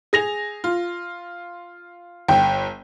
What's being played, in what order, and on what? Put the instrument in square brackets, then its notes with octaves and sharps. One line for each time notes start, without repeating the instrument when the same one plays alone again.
[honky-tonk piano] G#4 A#6 F7
F4
[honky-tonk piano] G1 [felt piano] G5